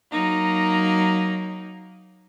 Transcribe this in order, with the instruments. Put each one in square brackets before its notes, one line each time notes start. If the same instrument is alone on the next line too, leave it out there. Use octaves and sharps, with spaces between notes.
[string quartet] F#3 A#3 D#4